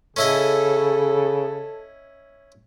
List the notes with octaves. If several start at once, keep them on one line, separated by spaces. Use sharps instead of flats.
C#3 C#4 E4 A4 D#5